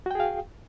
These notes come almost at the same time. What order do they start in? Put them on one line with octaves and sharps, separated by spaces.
F#4 G5 G#4 F5